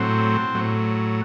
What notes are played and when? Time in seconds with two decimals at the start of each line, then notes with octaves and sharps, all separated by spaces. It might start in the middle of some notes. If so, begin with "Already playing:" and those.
Already playing: A2 F#3 C4
0.55 A2 F#3